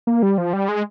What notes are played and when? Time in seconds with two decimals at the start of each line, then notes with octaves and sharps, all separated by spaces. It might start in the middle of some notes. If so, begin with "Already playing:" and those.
0.07 A#3
0.23 G3
0.38 F3
0.53 G3
0.69 G#3